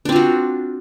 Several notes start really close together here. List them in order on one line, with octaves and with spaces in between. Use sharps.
D4 C4 F4 F#4